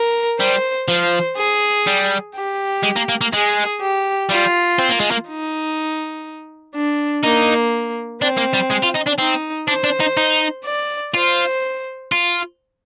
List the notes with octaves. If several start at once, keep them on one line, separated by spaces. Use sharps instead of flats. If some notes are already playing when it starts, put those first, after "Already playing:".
Already playing: A#4
G3 C5
F3 C5
G#4
G3
G4
G#3
A#3
A#3
A#3
G#3 G#4
G4
G3 F4
C4
A#3
G#3
A#3
D#4
D4
A#3 D#4
C4 D4
A#3
G3
G#3
F4
D#4
D4
C4 D#4
D4 C5
D4
D#4
D#4
D5
F4 C5
F4